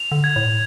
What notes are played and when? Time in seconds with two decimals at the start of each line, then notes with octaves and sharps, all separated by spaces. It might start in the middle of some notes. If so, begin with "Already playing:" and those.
Already playing: F7
0.12 D3
0.24 G#6
0.36 A2